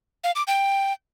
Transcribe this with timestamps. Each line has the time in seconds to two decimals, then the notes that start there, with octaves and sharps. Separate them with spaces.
0.24 F5
0.36 D6
0.47 G5